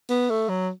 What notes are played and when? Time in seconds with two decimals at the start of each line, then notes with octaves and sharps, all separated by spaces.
0.10 B3
0.30 A3
0.49 F#3